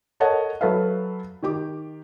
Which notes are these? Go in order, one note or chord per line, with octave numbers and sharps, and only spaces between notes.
A4 A#4 C#5 D#5 F#5 A5
F#3 A4 B4 E5 F5
D#3 G4 D6